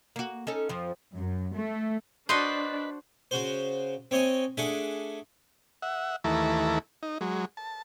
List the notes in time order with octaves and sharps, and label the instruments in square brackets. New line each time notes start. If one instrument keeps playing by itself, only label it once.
[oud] A#3 F#4
C#4 D#4 A4
F2 F3
[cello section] F#2
A3
[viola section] D4 [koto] F#4 C5 [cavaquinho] B4 D#5 C6
[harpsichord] C#3 F#4 C5
C4 C#5 D#5 G#5
A3 D4 G#4 F#5
[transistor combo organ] E5 F#5
D#2 E3 A3 E4 A5 A#5
D#4
F#3 G#3
A5